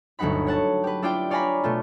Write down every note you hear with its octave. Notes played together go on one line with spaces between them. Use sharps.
G1 D2 F#3 D#4 F#5 B5
C#5 F#5 A5
G4 B4
D4 E4 F4 G4 D5 G5
C#5 D5 F5 G#5 A#5 B5
B2 A3 F4